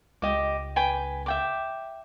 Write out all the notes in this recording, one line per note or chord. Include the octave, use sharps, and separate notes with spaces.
C#2 G4 D#5 D6
B4 G5 G#5
E5 G5 D6